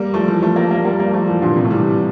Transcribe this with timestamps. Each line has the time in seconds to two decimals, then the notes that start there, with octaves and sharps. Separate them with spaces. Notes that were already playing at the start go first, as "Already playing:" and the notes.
Already playing: G3 A#3
0.14 F3 A3
0.28 E3 G3
0.42 F3 A3
0.56 G3 A#3
0.71 G3 A#3
0.84 G3 A#3
1.00 G3 A#3
1.13 F3 A3
1.28 E3 G3
1.41 A#2 D3
1.56 A2 C3
1.65 A3
1.70 E3 G3